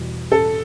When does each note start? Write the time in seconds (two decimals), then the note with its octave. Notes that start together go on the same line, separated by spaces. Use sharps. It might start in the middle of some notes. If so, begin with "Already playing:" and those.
Already playing: E2 B2 G3
0.32 A4